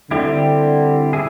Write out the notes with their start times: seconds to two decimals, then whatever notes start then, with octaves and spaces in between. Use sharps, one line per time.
0.11 D3 G3 C4 E4 G4
1.13 E4 G#4